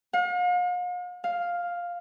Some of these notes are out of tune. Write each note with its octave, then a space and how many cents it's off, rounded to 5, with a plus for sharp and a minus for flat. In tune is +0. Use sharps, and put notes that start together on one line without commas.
F5 +45
F5 +5